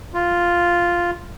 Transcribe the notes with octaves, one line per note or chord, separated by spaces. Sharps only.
F4